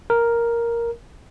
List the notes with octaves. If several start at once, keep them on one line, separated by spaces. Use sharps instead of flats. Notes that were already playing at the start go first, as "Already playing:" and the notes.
A#4